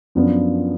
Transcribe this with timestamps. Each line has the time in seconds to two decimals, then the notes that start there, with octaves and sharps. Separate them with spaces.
0.15 F#2 F3 B3 D4 F4